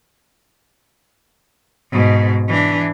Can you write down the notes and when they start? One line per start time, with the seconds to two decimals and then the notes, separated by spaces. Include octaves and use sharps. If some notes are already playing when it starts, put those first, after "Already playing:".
1.91 G#2 B2
2.49 E3 D4